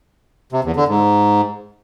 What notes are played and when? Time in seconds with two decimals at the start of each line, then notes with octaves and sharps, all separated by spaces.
0.52 C3
0.64 E2
0.76 D3
0.88 G#2